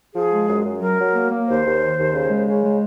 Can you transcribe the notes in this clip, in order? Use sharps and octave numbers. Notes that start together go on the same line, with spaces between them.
F3 G#4
G#3
F#2
F#2
F#3 A#4
F#3
A#3
A#3
D#2 C5
D#2
D#3
D#2
C#3
G#3
C#3
G#3